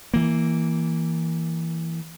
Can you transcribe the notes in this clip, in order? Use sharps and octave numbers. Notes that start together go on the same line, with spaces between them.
E3 A#3